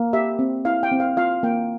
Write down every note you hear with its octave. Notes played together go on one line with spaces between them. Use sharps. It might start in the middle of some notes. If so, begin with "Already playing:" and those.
Already playing: A#3
G4 E5
C4
E4 F5
G5
C4
F5
F4 F5
A#3 G5